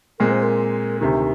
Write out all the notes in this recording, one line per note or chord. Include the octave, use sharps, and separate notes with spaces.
A#2 G#3 C4 A#4
C5
A#4
D2 C3 D#3 G4